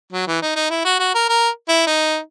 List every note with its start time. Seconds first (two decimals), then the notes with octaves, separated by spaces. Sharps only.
0.13 F#3
0.27 E3
0.42 D#4
0.56 D#4
0.70 E4
0.85 F#4
1.00 F#4
1.15 A#4
1.29 A#4
1.68 E4
1.87 D#4